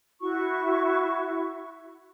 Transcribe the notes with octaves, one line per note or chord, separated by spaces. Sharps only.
E4 F#4 C#6